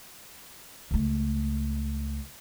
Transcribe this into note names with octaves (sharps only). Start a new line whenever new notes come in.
C#2 A3